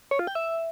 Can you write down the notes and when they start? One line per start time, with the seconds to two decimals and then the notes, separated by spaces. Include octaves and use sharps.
0.11 C#5
0.19 F4
0.27 G5
0.35 E5